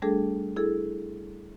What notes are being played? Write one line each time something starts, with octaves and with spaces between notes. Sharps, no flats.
G3 A3 D4 G#4 A4
E4 G#4 A4